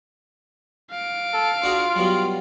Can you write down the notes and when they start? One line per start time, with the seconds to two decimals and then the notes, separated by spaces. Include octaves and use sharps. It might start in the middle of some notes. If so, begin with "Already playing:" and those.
0.91 F5 D7
1.34 A4
1.63 D4 F4 F#4 G#4
1.95 B2 F#3 G3